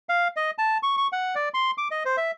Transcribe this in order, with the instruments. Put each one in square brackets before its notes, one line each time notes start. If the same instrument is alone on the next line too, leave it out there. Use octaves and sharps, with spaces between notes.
[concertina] F5
D#5
A5
C#6
C#6
F#5
D5
C6
D6
D#5
C5
E5